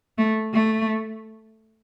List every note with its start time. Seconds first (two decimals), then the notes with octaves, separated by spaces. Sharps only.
0.18 A3
0.53 A3